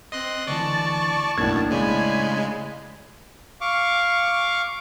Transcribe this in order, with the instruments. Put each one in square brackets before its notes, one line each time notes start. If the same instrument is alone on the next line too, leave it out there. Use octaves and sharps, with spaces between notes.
[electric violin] C4 [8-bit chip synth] D#5 C6 F#6
[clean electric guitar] D2 D3 E3 [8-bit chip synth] D5 [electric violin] A5 C#6
[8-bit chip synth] B1 F#2 [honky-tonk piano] A2 D4 G#6 [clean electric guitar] A#3
[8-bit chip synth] C#3 G#3 [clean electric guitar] D5 [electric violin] G#5 B5
[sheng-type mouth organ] F5 C#6 D6